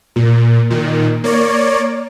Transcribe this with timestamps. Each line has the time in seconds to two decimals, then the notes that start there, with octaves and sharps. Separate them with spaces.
0.16 A#2
0.70 A#2 D#3
1.24 A#3 C#5 D5